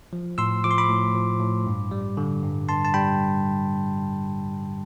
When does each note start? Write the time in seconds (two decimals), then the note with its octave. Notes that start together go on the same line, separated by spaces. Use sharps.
0.13 F3
0.38 A2 C6 E6
0.64 F3 D6
0.71 C6
0.78 B5 D6
0.89 A2
1.15 F3
1.40 A2
1.67 G2
1.91 G3
2.17 D3
2.43 G2
2.69 G2 A5 C6
2.85 A5
2.94 G3 G5 B5